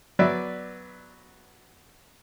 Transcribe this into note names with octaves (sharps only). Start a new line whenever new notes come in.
F#3 B3 B4 D5 E5